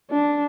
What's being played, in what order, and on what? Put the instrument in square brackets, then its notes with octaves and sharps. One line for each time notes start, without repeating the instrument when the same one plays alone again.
[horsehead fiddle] D4